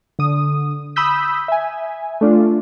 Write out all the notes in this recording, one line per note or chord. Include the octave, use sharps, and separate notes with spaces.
D3 D#6
B5 D#6 E6 G6 B6
E5 G#5
A3 D4 F4